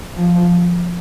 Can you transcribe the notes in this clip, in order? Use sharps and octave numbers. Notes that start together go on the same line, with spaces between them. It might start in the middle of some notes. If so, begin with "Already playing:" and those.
F3